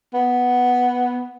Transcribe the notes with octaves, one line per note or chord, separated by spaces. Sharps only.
B3